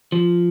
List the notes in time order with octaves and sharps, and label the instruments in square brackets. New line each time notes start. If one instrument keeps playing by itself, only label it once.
[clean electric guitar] F3